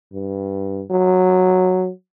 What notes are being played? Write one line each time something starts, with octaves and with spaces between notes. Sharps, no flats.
G2
F#3